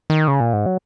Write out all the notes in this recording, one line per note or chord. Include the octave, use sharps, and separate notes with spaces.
D#3
C#3
A#2
G#2
F#3